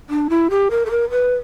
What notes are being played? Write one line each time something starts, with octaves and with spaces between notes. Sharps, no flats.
D4
E4
G4
A#4
A4
A#4
B4